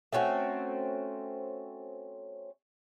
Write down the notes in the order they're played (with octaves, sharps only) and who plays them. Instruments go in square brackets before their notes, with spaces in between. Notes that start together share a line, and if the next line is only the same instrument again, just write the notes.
[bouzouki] A3 C4 C#4 F#4